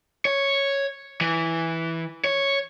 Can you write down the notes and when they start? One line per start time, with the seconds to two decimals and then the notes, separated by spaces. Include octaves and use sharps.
0.25 C#5
1.21 E3
2.24 C#5